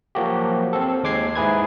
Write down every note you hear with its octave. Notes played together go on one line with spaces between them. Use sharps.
F3 F#3 A#3 F#4 G4
C4 A4
D#2 G#3 D6 G#6 C7
G#2 E4 G#4 B4 G#6